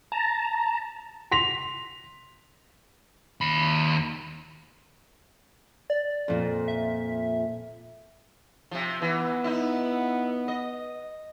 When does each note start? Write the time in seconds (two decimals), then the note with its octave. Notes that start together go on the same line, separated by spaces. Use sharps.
0.12 A5 A#5
1.31 C6 A#6 B6 F7
3.41 D#2 B5
5.90 D5
6.28 F2 A#2
6.68 E5
8.71 C3 F3
9.02 E3 B3
9.44 D#4 E4
10.48 D#5